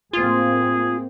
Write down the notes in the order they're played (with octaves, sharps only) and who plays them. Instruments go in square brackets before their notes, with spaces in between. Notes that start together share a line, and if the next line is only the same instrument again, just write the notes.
[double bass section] A2 A#3 C4 [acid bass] F4 [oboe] G#4